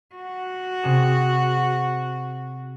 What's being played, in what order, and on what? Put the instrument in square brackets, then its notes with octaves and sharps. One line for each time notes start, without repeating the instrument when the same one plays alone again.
[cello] F#4
[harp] C3 G#4 E7